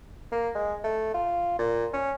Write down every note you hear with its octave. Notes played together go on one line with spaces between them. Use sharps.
A#3
G#3
A3
F4
A#2
C#4